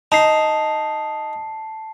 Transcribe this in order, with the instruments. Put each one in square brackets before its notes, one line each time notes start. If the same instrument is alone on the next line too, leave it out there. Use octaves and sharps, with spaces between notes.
[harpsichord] D#4 [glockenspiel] A5 C7